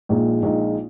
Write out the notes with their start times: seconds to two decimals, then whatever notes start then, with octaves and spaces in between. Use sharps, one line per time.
0.09 A#1 A#2 G#3 D#4
0.43 A#1 A#2 G#3 D#4